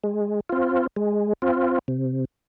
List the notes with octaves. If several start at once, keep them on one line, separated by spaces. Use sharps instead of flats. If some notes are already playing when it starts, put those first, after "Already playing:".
G#3
C4 F4
G#3
C4 F4
C3